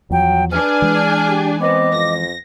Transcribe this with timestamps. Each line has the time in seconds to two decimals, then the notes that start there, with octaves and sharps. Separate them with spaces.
0.11 E2 F3 F#3 G5
0.52 D4 G#4 B4 G#5 F6
0.82 E3 G#3
1.29 G4
1.61 B3 C4 D#5 D6
1.93 F2 A#6